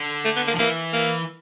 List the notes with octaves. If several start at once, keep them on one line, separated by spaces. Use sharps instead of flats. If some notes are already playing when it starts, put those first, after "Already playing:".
Already playing: D3
A3
B3
A#3
F3
E3 A#3
A#3